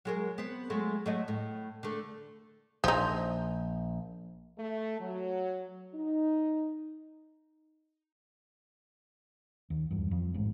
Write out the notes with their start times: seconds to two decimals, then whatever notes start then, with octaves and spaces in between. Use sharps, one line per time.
0.05 F#3 G#3 A#4
0.38 B3 C4
0.70 F#3 G#3 A3
1.06 F#3 A3 D#5
1.28 A2
1.83 D3 A3
2.84 A#1 F3 D#4
4.58 A3
5.00 F#3
5.94 D#4
9.70 D#2
9.91 E2 G2
10.11 F2
10.34 A1 G#2